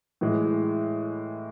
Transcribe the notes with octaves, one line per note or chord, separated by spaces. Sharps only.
A2 E3 G#3